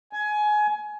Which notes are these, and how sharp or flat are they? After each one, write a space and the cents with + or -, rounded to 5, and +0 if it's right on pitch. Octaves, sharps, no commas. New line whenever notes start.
G#5 +20